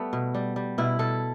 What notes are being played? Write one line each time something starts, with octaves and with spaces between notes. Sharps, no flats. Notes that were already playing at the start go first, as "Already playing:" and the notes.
Already playing: G3 A3 B3
B2
G3
G3
B2 E4
B2 A4